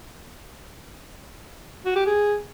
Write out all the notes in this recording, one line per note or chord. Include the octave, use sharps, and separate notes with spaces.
F#4
G4
G#4